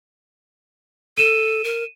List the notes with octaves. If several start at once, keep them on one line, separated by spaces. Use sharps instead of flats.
A4 D#7 E7
A#4